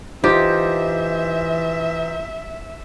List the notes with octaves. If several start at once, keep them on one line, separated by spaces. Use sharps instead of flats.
E3 D#4 F4 G4 C5 E5